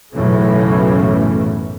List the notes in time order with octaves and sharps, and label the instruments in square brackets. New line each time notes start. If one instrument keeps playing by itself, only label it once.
[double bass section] B1 F#2 A2 C#3 E3 A3